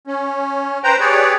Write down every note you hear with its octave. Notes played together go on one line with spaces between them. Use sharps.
C#4
B4 C5 G5 A#5
G4 G#4 B4 C#5 D5